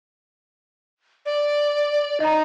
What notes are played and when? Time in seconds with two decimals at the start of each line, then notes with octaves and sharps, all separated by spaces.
1.26 D5
2.20 D#4 D#5 A#5